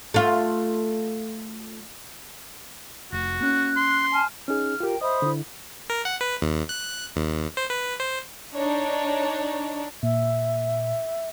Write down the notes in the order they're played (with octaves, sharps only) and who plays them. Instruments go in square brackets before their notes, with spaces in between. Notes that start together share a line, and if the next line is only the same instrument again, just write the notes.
[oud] A3 F4
[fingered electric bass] F1 [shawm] F#4
[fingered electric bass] A#3 C#4 [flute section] F#6
[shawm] C6
[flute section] G#5 A5 F6
[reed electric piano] C#4 D#4 G#4 [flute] F6
[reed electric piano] F4 G4 [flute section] A#4 G5
[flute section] C5 B5 [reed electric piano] D#5 E5 [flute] D#6
[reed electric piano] D3 E4
[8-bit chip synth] A#4
F#5
B4
D#2
F#6
D#2
C5
B4
C5
[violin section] D4 D#4 C#5
[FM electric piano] A#2 [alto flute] E5